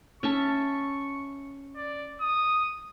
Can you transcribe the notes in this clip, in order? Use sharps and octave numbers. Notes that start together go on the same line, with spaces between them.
C#4 E5 A5 C#6
D5
D#6